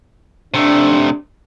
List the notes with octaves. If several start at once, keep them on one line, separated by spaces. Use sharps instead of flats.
C3 A3 D4